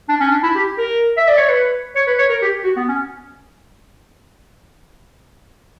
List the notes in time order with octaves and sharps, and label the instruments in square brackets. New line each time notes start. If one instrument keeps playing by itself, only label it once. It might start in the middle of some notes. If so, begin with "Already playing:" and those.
[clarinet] D4
C#4
D4
E4
G4
A#4
E5
D5
C#5
B4
C#5
B4
C#5
A#4
G4
F#4
B3
C#4